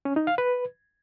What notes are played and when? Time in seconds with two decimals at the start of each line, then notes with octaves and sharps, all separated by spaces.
0.05 C#4
0.16 D#4
0.27 F5
0.38 B4